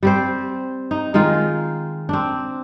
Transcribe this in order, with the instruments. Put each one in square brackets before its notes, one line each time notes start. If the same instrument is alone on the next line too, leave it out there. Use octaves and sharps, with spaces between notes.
[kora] G3 C4 C5
D#4
D#3 G#3 D#4 F4
C4 D4